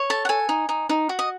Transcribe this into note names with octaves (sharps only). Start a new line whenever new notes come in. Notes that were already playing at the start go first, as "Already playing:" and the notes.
Already playing: C#5
A4 A5
F#5
A4 G#5
D#4
D#4
D#4
F#4
D#5